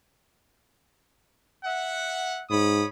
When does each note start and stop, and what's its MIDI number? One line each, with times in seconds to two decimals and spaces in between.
1.63 2.43 76
1.63 2.43 78
2.50 2.84 44
2.50 2.88 73
2.50 2.88 83
2.50 2.88 87